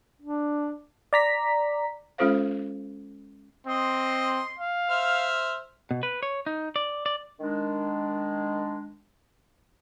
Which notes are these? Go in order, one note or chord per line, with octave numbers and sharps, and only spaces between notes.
D4
D5 A#5 B6
G#3 C#4 F4 A4 C5 F5
C4 D#5 C6
F5
C5 E5 F6
B2
B4
C#5
D#4
D5
D5
D#3 G#3 D4